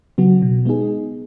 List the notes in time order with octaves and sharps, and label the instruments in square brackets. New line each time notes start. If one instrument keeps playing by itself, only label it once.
[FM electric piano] C#3 F#3 B3 F#4
B2
G#3 B3 D#4 G#4